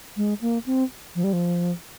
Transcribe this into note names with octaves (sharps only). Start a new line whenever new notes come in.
G#3
A#3
C4
F3
G3
F3